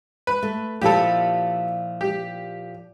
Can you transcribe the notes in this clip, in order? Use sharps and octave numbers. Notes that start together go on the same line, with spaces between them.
B4
A3
A#2 F3 E4 G4 A4
G4